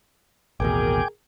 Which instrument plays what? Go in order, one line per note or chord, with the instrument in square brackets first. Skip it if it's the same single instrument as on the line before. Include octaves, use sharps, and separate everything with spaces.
[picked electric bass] A1 D#2 B2 [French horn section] G#4 A#4 [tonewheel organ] G5 G#5 D6